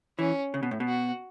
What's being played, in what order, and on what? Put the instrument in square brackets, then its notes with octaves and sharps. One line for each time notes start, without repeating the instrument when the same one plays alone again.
[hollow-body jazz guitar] E3 [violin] C#4
[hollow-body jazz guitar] C#3
B2
A2
B2
[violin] F#4